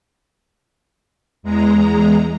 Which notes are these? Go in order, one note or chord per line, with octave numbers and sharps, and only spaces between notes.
E2 G#3 A#5